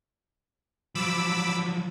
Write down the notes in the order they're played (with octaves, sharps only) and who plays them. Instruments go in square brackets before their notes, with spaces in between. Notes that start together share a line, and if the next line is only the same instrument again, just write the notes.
[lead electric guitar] F3 F#3 [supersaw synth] B5 D6 E6